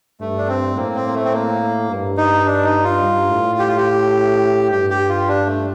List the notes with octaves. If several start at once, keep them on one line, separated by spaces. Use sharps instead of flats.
G2 A3
D4
C4
A2 A#3
C4
A#3
A3
C4
A#3
G2
D#4
D4
D#4
F4
G2
A2
G4
F4
G4
G2 G4
G4
F4
D4
A3